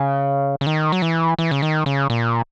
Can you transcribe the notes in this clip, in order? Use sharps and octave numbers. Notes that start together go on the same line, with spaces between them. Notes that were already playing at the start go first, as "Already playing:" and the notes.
Already playing: C#3
C#3
D#3
F#3
E3
E3
C#3
D#3
C#3
A#2